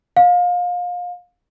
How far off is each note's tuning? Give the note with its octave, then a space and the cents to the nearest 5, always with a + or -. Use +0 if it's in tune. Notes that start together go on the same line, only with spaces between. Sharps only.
F5 +30